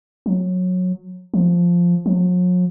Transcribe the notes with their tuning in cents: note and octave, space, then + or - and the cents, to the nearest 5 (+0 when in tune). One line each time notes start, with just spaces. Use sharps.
F#3 -20
F3 +0
F#3 -45